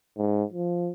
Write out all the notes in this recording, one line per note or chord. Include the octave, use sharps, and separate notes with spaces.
G#2
F3